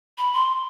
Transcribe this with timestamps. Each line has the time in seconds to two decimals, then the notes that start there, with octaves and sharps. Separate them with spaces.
0.18 B5
0.33 C6